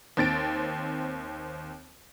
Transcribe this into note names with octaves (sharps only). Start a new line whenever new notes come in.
D#2 C4 A6 D7